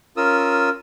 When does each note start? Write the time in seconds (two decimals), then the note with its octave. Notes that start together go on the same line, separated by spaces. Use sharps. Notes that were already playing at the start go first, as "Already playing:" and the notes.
0.17 C#4 F4 A#4 D#6 E6